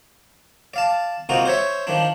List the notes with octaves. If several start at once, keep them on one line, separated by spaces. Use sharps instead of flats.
D5 F5 A5
C3 A#3 D#4 F4 F#4
C5 C#5 E5
D#3 F3 D4